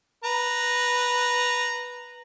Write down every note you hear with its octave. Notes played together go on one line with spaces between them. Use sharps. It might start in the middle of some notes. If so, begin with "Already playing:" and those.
B4 A#5